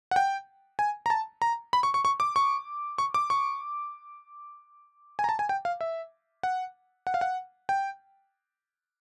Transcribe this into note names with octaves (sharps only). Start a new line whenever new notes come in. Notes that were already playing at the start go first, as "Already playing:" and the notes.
F#5
G5
G#5
A#5
A5
A#5
B5
C#6
C#6
C#6
D6
C#6
C#6
D6
C#6
G#5
A#5
A5
G#5
G5
F5
E5
F#5
F#5
F5
F#5
G5